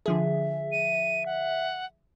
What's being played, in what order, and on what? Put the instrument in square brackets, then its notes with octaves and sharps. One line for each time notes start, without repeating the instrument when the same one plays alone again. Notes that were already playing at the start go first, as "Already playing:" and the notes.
[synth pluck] D3 F3 G#4 [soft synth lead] E5
[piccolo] D#7
F#5